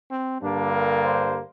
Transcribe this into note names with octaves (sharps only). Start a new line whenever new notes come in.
C4
G2 D3 G3 A#3 D4
A#4
C5